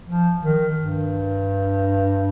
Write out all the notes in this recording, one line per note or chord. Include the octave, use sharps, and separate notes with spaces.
F3
D#3
G2